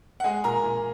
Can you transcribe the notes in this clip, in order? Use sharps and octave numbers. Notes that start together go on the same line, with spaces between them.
F#5
G#3 G#4 G#5
A#2 A#4 A#5
A#2